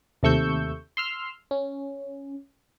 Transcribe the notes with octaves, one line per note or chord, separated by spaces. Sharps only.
D#2 C3 A3 C#6 E6 G6
C6 E6 F6
C#4